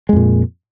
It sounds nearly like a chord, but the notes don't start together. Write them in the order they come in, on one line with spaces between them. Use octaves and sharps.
G#3 F2 A#2